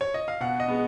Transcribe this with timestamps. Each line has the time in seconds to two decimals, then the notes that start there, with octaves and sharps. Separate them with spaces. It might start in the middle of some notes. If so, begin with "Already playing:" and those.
0.01 C#5
0.14 D#5
0.28 F5
0.40 B2 F#5
0.60 D#5
0.68 G#3 B3